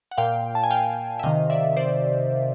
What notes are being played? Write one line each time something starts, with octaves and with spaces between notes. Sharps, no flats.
F#5
A#2 F5 G5
A5
G#5
F5 G5
E5
C3 D#3 D#5 F5
D5 E5
C5 D5